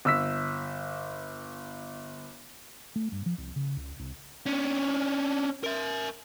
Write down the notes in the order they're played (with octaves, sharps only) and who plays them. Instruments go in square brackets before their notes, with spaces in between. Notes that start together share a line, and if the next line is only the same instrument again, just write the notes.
[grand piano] G1 E6 B6
[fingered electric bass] A3
G2
F3
C2
C#3
C#2
C2
[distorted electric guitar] C#4 D4
A#4 E5